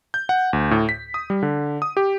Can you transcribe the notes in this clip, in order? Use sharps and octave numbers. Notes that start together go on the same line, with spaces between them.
G6
F#5
D2
A2
B6
D#6
G3
D3
D#6
G4